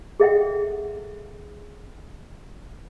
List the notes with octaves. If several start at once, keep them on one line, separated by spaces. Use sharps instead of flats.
G#4 A4 D#5 E5 F#5 G5